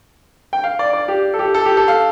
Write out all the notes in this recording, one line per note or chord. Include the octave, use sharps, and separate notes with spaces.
G5
F5
D5
D5
G4
A4
G4
A4
G4
A4
F5